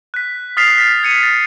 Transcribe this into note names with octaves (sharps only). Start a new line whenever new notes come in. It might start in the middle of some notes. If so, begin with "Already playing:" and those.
F#6 B6
D#6 F6 A6 B6 C7 F7
A6 B6
G#6 C#7 D#7
A6